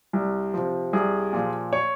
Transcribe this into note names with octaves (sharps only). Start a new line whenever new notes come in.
C2
C3 F3
C2 G#4
A#2 F3
C#5